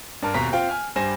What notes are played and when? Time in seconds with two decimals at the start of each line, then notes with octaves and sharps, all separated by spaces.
0.22 G2 D4 A#4 A5
0.34 D#1 B2 C4 C5 A#5 B6
0.53 C4 F4 F5 G5
0.69 G#5 F6
0.96 G2 G3 C5 G#5 A#6 E7